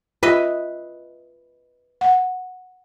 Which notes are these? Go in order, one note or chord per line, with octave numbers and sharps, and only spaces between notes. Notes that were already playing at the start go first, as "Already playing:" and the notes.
F4 B4 D#5 E5
F#5